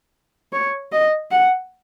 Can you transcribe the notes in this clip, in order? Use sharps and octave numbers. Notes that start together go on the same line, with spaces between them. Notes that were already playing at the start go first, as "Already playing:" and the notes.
C#5
D#5
F#5